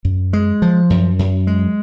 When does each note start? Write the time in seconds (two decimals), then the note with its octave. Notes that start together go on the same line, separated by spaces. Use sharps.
0.05 F#2
0.33 G#3
0.62 F3
0.90 F#2
1.19 F#2
1.47 G#3